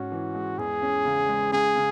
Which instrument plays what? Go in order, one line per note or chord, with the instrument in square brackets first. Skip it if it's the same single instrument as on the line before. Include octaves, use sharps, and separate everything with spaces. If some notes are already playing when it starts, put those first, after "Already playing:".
Already playing: [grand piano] G#2 C#4 [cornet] F#4
[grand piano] E3
G#3
[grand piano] E2 [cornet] G#4
[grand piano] C#4
C#3
G#3
[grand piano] C#3 [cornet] G#4
[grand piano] C#3